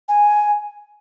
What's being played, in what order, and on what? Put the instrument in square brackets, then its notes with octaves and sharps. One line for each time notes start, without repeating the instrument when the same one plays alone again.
[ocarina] G#5